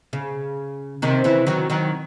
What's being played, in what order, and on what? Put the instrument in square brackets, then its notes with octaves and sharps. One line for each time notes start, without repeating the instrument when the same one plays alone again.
[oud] C#3
C3 D#3
C#3 E3
D#3 F#3
D#3 F#3